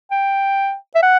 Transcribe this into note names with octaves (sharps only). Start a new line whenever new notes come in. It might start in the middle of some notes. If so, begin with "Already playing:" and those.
G5
E5
F#5